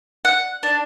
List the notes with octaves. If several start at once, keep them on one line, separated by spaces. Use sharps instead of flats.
F#5
D4